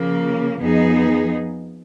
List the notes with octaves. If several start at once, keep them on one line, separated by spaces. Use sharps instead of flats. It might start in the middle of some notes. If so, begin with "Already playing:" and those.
Already playing: C#3 F3 A#3
F2 F3 B3 D#4 G#4